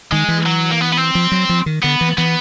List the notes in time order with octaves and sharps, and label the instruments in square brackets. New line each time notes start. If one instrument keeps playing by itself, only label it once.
[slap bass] D#3 [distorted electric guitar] G#3
[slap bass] E3
[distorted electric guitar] F#3
A#3
B3
B3
C4
[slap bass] F3
F#3
F3
D#3
[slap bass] D3 [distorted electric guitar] B3
[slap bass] E3
[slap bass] E3 [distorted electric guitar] B3